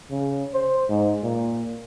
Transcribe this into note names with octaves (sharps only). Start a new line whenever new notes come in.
C#3
C5
G#2
A#2